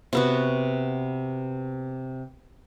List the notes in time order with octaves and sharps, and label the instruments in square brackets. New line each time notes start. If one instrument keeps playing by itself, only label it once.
[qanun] C3 B3 F#4